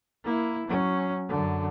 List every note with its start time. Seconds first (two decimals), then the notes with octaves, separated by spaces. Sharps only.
0.24 A#3 E4
0.67 F#3 C#4
1.29 F#2 D3